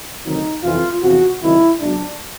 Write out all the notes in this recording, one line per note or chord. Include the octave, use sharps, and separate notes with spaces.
D2 C3 D#3 F#3 D#4
F2 C3 E3 F4
E2 C3 F3 F#4
C#2 C3 D#3 F#3 E4
C#2 B2 F#3 D4